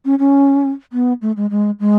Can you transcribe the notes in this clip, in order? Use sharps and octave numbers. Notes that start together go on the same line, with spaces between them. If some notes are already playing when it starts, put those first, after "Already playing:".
C#4
C#4
B3
A3
G#3
G#3
G#3